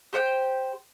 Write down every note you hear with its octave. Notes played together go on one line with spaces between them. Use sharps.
G4 C5 F#5 G5